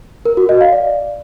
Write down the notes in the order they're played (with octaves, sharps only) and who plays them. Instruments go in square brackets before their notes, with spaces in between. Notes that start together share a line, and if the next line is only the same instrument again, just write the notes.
[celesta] A#4
F#4
D#5
F5
D5